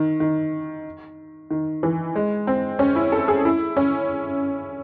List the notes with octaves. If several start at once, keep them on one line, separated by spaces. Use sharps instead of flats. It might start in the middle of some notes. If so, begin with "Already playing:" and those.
Already playing: D#3
D#3
D#3
E3
G#3
C4
C#4
E4
A4
G#4
E4
C#4